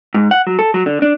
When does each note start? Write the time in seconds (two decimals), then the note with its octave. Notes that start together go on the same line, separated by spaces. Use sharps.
0.14 G#2
0.31 F#5
0.47 F#3
0.59 A4
0.74 F#3
0.86 D3
1.02 D4